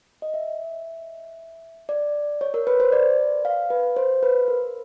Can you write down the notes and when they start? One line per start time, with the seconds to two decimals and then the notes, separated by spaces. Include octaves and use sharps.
0.22 D#5
0.34 E5
1.89 D5
2.41 C#5
2.54 A#4
2.67 B4
2.80 C5
2.92 D5
3.45 F5
3.70 B4
3.96 C5
4.23 B4
4.48 A#4